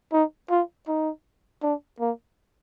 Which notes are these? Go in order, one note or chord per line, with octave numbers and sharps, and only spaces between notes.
D#4
F4
D#4
D4
A#3